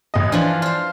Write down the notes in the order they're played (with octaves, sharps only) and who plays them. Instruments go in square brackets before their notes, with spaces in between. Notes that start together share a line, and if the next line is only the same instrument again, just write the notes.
[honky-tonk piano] A1 D#5
[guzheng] E3 F3 F4 [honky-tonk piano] D4
[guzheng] F4 C5